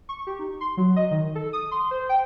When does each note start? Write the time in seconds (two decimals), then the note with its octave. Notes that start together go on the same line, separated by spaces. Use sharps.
0.09 C#6
0.27 G4
0.39 D#4
0.61 C6
0.77 F#3
0.96 D#5
1.11 D#3
1.35 A4
1.53 D#6
1.71 C6
1.91 C5
2.09 G5